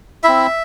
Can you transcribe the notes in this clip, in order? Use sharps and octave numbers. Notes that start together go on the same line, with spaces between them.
C4 E4 E5